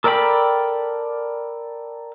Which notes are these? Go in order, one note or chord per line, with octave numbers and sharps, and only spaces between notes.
A4 A#4 D5 G5 B5